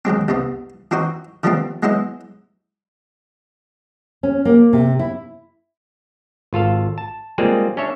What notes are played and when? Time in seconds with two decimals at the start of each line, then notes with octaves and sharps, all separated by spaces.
0.05 D#3 F#3 G#3 C4
0.28 C2 G2 C3 B3
0.91 E3 C4 D#4 F#4 C5
1.43 D#3 F3 G3 A3 B3 C4
1.83 F#3 G#3 B3 E4 C5 D#5
4.23 C#4
4.45 A#3
4.73 C3
4.99 E4
6.53 G#1 F4 A4 F5
6.98 A5
7.38 G3 G#3 A#3 C4 F4 G#4
7.77 C#4 D4 C#5 E5